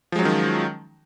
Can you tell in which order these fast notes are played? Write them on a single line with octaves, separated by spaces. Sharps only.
F3 G#3 F#3 C#4 D#3